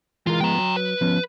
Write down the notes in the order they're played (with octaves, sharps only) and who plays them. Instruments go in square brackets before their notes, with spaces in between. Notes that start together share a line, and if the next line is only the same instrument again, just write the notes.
[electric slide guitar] E3 G#3 A#4 [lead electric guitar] F4
[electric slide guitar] F3 G#3 B3 [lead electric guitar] G5 A#5
[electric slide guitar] F#3
[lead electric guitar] B4
[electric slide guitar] F3 B3 C#4